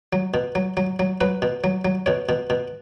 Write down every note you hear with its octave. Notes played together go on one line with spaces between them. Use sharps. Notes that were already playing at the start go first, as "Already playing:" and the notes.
F#3
B2
F#3
F#3
F#3
F#3 B4
B2
F#3
F#3
B2 C#5
B2
B2